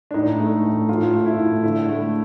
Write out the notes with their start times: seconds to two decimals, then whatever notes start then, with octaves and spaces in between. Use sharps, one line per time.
0.11 D4
0.14 A2 D#4
0.40 A3
0.64 A2
0.89 A2 F4
1.14 A3
1.26 E4
1.39 A2
1.63 D3 E4
1.88 A3